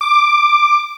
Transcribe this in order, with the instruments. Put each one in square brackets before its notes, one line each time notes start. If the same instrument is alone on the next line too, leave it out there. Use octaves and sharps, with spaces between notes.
[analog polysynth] D6